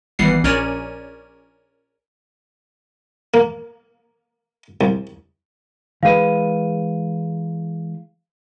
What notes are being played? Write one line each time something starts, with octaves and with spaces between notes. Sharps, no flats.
G#1 E3 G3 B3 F#5 C7
A#1 C#4 A#4 C#5 D5 D#7
A#3
C2
E3 G#3 B4 F5 D#7